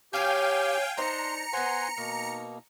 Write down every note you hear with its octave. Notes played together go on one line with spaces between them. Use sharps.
F#3 C#4 G4 F5 G5 G#5 G6
D4 D#4 C5 A#5 C6 C#7
B3 C5 F#5 G#5 C6
B2 D#3 A#3